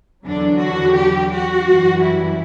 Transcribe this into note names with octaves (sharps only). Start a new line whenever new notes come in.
E2 D3 F#3 D4
F#4
G4
F#4
F#2 E3 G3
E4